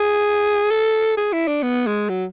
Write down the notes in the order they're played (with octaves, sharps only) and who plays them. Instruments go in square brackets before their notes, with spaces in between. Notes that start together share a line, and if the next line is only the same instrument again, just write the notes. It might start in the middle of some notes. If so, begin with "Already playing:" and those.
Already playing: [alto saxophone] G#4
A4
G#4
E4
D4
B3
G#3
F#3